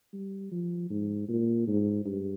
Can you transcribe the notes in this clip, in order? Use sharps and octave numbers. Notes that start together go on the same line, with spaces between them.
G3
F3
G#2
A#2
G#2
G2